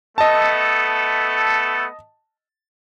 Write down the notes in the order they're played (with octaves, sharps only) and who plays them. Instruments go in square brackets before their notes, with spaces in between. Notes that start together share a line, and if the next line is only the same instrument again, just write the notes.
[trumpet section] A3 B3 A4 [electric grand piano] D#5 A5